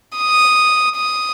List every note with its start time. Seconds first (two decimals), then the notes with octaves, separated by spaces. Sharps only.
0.17 D#6
0.97 D#6